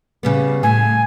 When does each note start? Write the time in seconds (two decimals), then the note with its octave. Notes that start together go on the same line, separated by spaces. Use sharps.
0.23 C#3 G3 B3
0.63 A2 G#5